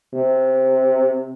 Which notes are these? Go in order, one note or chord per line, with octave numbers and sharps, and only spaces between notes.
C3